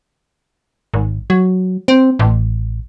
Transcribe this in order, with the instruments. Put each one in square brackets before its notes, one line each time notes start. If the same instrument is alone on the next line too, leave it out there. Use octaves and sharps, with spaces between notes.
[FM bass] G#1
F#3
C4
A1